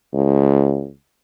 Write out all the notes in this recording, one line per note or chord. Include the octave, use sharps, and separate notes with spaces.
C#2